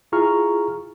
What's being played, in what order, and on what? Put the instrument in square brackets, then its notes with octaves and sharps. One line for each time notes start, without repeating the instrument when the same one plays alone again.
[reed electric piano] E4 F4 G#4 A#5 C#6 F6